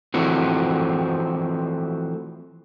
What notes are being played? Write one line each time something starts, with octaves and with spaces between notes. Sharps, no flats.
E3 F3 A3 C4 F#4